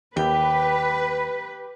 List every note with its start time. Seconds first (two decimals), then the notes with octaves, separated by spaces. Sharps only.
0.17 D#2 G4 B4